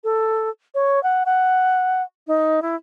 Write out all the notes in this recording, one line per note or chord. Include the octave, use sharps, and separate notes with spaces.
A4
C#5
F#5
F#5
D#4
E4